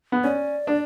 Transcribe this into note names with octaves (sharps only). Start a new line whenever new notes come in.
B3
C#4 D5
D4